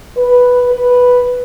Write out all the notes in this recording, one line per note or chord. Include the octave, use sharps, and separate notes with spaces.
B4
B4